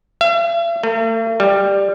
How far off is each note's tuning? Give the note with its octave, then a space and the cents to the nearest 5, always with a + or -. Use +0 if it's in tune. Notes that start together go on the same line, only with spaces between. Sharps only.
E5 +45
A3 +45
G3 +10